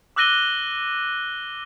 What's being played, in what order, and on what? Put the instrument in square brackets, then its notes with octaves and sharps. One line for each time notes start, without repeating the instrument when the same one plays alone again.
[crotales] D6 E6 F#6 A#6 D#7 G7